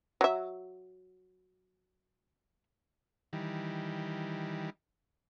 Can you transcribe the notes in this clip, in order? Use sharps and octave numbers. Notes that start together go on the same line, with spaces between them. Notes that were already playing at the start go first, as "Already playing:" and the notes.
F#3 E5
D#3 E3 G3